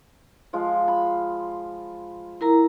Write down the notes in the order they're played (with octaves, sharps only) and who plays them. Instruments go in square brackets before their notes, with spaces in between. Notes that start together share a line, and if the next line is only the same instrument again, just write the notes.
[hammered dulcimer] F3 G#3 F4
B5
[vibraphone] E4 A#4 A#5